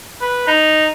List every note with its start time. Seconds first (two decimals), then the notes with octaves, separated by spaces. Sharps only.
0.21 B4
0.47 D#4